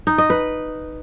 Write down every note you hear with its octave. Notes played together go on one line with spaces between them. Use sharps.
D#4
D#5
B4